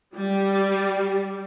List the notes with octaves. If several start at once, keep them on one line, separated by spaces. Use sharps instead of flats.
G3